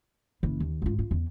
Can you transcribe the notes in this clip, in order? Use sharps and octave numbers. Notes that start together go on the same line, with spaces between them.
F#1 E3
D#2
G#2 F4
F4
E2